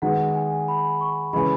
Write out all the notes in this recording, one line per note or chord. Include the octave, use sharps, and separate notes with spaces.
D#3 G#3 B3 D#4 F#4 F#5
G#5
B5
C#6
C#3 E3 G#3 B5